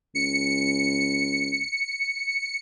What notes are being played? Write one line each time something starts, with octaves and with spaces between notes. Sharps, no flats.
C#2 C#7